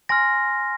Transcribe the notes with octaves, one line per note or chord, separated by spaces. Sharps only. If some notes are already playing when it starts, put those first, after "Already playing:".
G#5 C6 F6 A#6